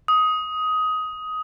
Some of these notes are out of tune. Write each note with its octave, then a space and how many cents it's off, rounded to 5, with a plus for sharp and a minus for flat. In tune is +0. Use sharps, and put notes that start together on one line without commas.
D#6 +15